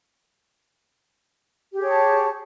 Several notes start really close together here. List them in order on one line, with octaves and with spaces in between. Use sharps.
G4 G#4 C#5 A5